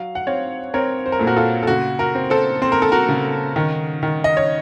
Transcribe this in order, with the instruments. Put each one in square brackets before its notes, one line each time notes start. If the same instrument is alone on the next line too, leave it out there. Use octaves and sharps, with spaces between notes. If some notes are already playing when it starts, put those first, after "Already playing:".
Already playing: [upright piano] F#3 F5
F#5
C4 C#5 F5
C4 A#4 C#5
C5
A#4
A#2 A4
F#4 A#4
F4 A4
A4
C#3 F#4
F#4 A#4
C4
A4 C5
C4 C5
A#4
A4
F#4 A#4
C#3
D#3
D#3
D#5
C#5